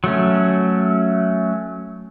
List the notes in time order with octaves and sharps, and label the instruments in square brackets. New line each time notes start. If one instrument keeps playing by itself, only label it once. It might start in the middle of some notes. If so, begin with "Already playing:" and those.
[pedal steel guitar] F#3 A3 C#4